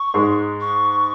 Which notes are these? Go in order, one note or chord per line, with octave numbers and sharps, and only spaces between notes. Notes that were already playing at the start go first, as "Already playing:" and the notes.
Already playing: C#6
G#2 G#3
C#6